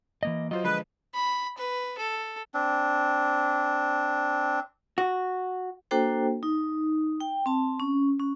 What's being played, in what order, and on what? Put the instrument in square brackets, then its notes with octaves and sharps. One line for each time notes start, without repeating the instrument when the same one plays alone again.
[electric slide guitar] E3 A#3 D#5
[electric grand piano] F#3 F4 C5 [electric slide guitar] D#5
[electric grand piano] D3 F3 G#3 [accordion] B4
[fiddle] B5
B4
A4
[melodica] C4 D4
[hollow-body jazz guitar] F#4
[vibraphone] A#3 D4 F#4 A4 C5 G5
D#4
G5
C4 A5
C#4
C#4